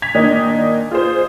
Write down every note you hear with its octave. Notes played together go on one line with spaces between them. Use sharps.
G#6 B6 F7
A#2 D#3 D4 D#4
F4 G#4 C5